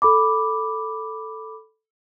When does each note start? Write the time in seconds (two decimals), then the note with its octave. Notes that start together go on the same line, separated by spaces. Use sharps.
0.02 A4 B5 D6